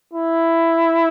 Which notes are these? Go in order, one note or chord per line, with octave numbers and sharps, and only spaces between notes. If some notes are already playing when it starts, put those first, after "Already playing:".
E4